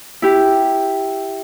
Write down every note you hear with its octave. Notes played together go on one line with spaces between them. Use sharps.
E4 G4